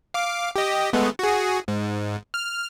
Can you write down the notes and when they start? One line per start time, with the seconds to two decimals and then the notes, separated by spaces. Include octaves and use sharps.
0.14 F5 D6
0.56 G4 D#5
0.93 G#3 A3 B3
1.19 F#4 G#4
1.68 G#2
2.34 F6